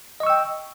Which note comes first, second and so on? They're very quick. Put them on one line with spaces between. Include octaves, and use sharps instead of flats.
D#5 C#6 E6 G5